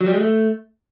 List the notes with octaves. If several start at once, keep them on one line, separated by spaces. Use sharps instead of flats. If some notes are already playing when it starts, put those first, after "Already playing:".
F#3
G3
G#3
A3